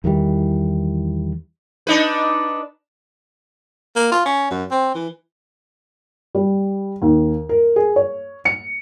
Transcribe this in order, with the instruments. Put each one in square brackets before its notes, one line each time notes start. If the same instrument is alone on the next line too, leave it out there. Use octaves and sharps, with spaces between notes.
[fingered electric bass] E2 D#3 E3 G3
[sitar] D4 D#4 B4
[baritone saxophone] A#3
F4
C#4
F#2
C4
E3
[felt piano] G3
D#2
A#4
G#4
C#5
C#7